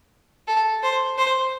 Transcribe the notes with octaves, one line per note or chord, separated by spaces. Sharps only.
A4
C5
C5